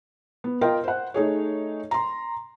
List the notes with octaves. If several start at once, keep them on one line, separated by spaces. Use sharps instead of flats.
B3
F4 A#4 D#5 G5 C6
C5 F#5
A3 D#4 G#4 C#5
A#5 C6